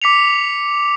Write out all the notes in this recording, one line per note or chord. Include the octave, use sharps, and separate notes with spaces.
D6 B6 C#7 F7